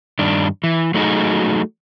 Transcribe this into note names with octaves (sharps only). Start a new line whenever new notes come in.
G2 D#3 D4
E3
F#3 A3 D#4 F#4 G#4